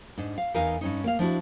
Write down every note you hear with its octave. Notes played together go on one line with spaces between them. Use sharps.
G#2 D4
F5
E2 D#4 A#4 F5 G#5
G2 C#4 D#4
A#3 F5
F3 D4 E4 F#4